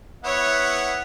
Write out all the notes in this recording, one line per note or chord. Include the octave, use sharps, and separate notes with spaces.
B3 E4 C#5 F#5